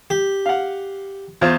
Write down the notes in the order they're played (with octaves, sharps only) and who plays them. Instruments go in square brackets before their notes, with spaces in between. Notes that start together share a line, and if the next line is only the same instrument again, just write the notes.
[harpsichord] G4
[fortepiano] F5 F#5
E2 F4 C5